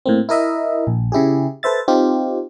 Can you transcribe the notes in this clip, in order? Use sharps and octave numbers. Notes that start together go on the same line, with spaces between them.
A2 A#3 C4
E4 A#4 D#5 E5
A#1
C#3 E4 G4 G#4
A4 B4 C5 E5 A6
C4 D#4 F4 G4